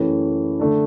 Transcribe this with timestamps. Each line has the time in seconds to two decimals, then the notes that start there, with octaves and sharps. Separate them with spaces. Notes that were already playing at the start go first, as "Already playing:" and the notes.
Already playing: F#2 E3 A3 C#4 G4
0.59 D3 A3 D4